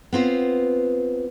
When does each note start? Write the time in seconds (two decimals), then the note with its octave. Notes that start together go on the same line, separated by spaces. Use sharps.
0.13 B3 C4 F4